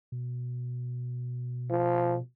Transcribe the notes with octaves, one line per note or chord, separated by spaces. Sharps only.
B2
F3